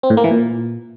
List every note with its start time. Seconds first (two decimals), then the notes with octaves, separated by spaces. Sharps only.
0.03 C4
0.10 A2
0.17 A#3
0.24 E3
0.31 A#2